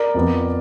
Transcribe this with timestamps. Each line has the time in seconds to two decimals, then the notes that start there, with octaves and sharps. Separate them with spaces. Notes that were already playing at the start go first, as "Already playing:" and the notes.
Already playing: A#4 D5
0.14 F2 F3 B3